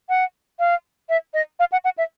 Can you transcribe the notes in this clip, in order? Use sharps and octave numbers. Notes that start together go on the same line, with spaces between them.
F#5
F5
E5
D#5
F5
F#5
F#5
E5